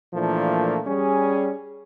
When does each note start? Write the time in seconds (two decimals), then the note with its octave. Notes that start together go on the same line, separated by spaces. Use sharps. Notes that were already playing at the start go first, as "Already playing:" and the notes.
0.14 A#2 E3 F3 A3 A#3 D4
0.87 G3 C#4 G#4